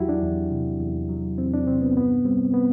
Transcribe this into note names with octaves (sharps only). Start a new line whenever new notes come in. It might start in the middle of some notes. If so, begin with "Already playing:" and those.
Already playing: E2 F#3 E4 F#4 G4
D4
E2
C3
E2
F#3
E2 C4
D4
C3 C4
B3
G2 B3
G3 C4
B3